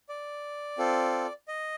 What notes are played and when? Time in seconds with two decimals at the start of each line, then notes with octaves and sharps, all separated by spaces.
0.09 D5
0.78 C4 F4 A4
1.48 D#5